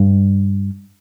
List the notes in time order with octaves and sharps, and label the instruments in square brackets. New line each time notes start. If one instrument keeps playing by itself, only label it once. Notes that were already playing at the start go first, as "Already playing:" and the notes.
Already playing: [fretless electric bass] G2